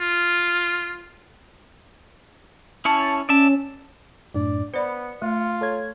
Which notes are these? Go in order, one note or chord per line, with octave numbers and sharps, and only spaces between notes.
F4
C#4 E4 C#5 A5
C#4 D5 E5 A5
F#2 A2 D4 D5
B3 C5 D5 B5 C#7
A3 F4
A4 C#5 G#6